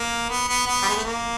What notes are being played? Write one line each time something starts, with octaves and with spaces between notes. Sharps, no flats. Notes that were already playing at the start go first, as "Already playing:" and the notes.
Already playing: A#3
B3
B3
B3
G3
G#3
A3
A#3